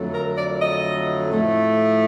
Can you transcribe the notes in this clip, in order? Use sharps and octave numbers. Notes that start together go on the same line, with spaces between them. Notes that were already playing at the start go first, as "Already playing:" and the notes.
Already playing: F2 D3 F#3 A3
A#4
D5
D#5
A2 F3 A3